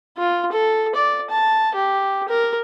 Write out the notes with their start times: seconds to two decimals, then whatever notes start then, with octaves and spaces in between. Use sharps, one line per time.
0.18 F4
0.52 A4
0.95 D5
1.30 A5
1.74 G4
2.28 A#4